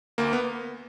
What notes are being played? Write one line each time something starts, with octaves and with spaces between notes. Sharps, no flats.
D2 A#3
B3